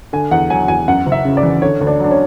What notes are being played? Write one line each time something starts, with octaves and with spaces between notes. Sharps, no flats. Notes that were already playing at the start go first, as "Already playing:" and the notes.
D3 G#5
E2 F#5
F#3 G#5
E2 G#5
F#2 F#5
F#1
E5
C#3
D5
E3
D3 C#5
D2
D4
F#3 D4
C#4